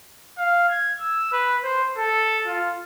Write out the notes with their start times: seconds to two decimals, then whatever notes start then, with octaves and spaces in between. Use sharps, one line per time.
0.38 F5
0.69 G#6
1.00 E6
1.32 B4
1.64 C5
1.98 A4
2.46 F4